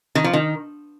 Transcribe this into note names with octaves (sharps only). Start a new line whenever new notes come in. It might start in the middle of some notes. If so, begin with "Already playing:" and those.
D#3
F3
D#3